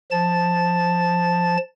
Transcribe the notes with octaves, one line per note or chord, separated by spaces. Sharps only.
F3 A5 A6